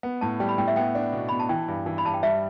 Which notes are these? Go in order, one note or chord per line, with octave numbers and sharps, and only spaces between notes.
B3
A2 A5
G3 G5
B5
A2 G5
E5
B3 G5
D4
B2
B2 B5
A5
E3 G5
G2
E3
B5
G2 A5
G5
G3 E5